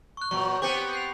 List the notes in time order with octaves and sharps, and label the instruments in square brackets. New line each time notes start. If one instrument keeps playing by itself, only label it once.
[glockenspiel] C#6 F#6
[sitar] A#2 F#3 [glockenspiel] C#6
[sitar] B3 C4 G4 [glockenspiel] D6 G6 C#7
[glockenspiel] G6 C7 F7